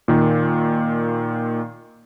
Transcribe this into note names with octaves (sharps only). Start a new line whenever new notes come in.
A#2 D#3